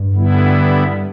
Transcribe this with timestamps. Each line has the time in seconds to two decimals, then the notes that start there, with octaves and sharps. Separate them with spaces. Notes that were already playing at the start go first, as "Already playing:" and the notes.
Already playing: G2
0.13 D3 G3 B3 E4